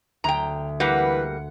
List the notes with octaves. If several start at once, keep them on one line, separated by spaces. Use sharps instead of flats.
D2 G5 A#5
E3 G3 A#3 B4 F#5